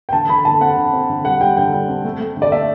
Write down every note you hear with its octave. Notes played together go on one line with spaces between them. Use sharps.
G5
D3 A5
D3 B5
D3 A5
C4 F#5
D3
C4
D3
G3 F#5
G3 G5
D3 G5
G3
C4
A3
A3
D3
D5
A3 E5